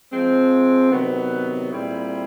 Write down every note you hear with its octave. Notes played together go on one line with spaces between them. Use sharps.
F3 G#3 C4
C3 D#3 F#3 B3
A#2 G3 C4 E4 G#4